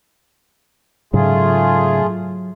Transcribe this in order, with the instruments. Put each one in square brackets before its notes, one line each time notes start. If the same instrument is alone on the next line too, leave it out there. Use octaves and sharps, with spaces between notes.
[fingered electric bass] G#2 C#3 [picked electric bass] F#3 [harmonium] A3 F4 G#4